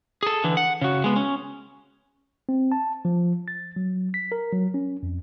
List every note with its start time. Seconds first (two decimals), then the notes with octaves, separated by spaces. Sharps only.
0.23 G#4 A4
0.44 D3 E3
0.57 F#5
0.81 C#3 F#4
1.04 G#3 B3
1.16 C#4
2.49 C4
2.72 A5
3.05 F3
3.48 A6
3.76 F#3
4.14 B6
4.32 A#4
4.53 F#3
4.74 C#4
5.03 F2